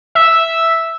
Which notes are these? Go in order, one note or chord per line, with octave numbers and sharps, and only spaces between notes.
E5